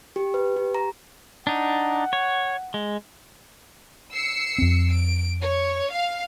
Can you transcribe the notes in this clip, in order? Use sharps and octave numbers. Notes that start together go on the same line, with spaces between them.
G4
B4
G4
A#5
D4 D#4 F#5
C#5
G#3
E6 C7 C#7
F2 C4
D7
C#5
F5